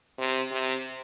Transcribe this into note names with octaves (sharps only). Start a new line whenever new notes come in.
C3
C3